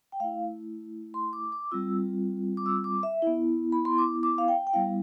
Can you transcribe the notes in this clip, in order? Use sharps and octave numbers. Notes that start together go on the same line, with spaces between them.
G5
A3 E4 F5
C6
D6
D6
G3 C4 F4 E6
D6
E6
D6
E5
B3 E4
B5
C6
D6
D6
F5
G5
G5
G3 B3 E4 F5